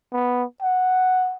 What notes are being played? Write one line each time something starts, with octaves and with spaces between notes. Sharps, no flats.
B3
F#5